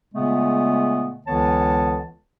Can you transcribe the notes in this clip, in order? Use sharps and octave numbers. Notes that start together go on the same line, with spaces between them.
A#2 C#3 G#3 A3 B3
C#2 D3 E3 B3 C#5 A5